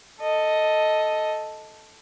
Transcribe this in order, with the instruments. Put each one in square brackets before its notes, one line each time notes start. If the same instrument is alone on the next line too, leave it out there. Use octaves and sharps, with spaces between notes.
[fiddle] A4 D#5